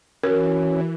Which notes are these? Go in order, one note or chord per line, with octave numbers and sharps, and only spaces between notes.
E3 C#4 F#4 A#4